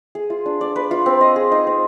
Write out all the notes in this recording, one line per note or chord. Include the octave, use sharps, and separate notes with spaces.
G#4
F4
D4
D5
B4
F4
C4
D#5
G#4
D#4
C4